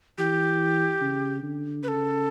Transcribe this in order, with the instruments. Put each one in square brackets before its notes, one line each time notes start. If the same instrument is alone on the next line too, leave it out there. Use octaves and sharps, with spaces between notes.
[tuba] E3 [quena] G4
[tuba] C#3
D3
[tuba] C#3 [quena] B4
[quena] A4